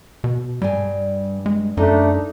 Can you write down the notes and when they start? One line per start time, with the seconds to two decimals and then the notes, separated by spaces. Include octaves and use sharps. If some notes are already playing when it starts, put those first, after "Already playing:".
0.24 B2
0.62 G2 G3 G#5
1.46 G#3
1.77 F#2 A3 D4 D#4